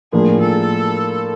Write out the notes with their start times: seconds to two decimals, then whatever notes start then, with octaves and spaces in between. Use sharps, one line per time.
0.13 A2 F3 A#3 D4 G#4
0.40 A4